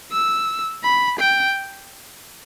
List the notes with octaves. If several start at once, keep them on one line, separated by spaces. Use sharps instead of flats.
E6
B5
G5